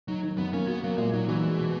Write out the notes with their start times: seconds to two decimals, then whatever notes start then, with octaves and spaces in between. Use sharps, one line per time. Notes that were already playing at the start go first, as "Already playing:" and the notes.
0.08 F#3 D#4
0.23 D#3
0.38 F#2 B3
0.53 A#3 C#4
0.68 B3 F#4
0.83 F#3 A#3
0.98 A#2 G#3
1.13 F#3 D#4
1.28 E3 F#4
1.44 G#3
1.58 B2